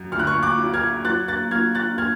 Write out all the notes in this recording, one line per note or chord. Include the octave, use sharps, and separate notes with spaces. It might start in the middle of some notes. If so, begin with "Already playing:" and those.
Already playing: F#2
D2 F6
F#6
C#6 F6
D6 F#6
F#3
F6 G#6
F#3 F#6 A6
F#6 A6
F#3 F6 G#6
F#6 A6
F6 G#6